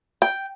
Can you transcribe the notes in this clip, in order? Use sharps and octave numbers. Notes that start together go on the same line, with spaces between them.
G5